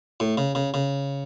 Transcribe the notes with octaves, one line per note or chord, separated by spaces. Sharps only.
A2
C#3
C#3
C#3